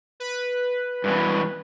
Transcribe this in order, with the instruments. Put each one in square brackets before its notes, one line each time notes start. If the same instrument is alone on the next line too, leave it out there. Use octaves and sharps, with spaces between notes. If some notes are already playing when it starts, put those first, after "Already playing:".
[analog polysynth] B4
[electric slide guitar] G2 B2 E3